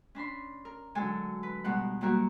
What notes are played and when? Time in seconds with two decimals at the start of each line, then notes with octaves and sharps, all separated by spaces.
0.15 C#4 D4 B5 C6
0.65 A#4
0.95 D3 F#3 G#3 A4 G#5 A5
1.43 B4
1.64 B2 D#3 G3 G#3 F#5
2.01 D#3 F#3 G3 A#3 F#4 A#4